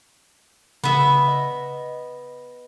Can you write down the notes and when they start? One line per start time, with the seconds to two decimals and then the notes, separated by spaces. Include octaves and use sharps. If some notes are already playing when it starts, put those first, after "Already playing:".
0.84 C#3 B3 E5
1.28 D#5